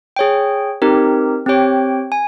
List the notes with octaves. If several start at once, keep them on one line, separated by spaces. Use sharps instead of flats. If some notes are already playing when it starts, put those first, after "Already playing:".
G#4 C#5 G5
C4 D#4 G4 A#4
C4 G4 C#5 G5
G#5